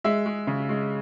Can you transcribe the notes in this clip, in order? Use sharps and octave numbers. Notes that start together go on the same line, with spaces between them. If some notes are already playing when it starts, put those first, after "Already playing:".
G#3 E5
G#3
C#3
G#3